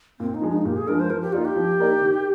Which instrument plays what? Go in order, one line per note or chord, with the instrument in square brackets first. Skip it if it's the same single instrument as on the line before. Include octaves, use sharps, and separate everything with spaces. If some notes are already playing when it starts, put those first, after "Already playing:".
[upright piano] A#2 [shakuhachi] C4
[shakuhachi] D#4
[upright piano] F3 G#3 D4
[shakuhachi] D#4
[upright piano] A#2 [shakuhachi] G4
[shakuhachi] G#4
[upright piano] F3 G#3 D4 [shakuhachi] A#4
[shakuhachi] C5
[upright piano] F3 [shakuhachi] A#4
[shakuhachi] G4
[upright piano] A#3 D#4 A#4 D5 [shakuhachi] F4
[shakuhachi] G4
[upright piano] F3
A#3 D#4 A#4 D5
D#3